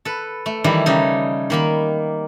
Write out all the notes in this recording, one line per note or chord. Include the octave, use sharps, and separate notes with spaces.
A4 B4
A3
D#3 E3 G3 E4
C#3 G3 D#4
D#3 A#3 B5